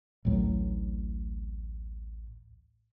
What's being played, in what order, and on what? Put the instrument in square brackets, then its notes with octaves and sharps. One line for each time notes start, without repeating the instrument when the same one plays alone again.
[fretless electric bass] A1 D2 A2 F#3